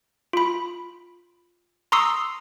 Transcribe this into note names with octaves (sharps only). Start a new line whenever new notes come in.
F4 B5
A#5 C6 C#6 D#6 E6 C7